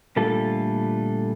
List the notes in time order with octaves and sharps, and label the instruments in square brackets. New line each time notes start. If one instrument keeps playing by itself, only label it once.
[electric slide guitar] A#2 D3 G3 A3 F4 A4